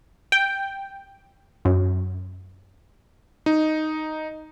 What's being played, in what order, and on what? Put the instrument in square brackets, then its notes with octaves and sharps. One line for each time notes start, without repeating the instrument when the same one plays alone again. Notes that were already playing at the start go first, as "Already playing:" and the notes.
[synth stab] G5
F#2
[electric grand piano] D#4